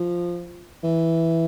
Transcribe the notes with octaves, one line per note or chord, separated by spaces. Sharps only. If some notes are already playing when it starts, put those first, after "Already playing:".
Already playing: F3
E3